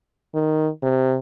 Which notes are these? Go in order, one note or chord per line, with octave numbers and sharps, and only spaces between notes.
D#3
C3